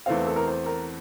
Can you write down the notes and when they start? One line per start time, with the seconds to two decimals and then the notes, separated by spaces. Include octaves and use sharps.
0.06 E2 E3 A3 C4 F5
0.27 A4
0.36 A#4
0.47 C5
0.66 A#4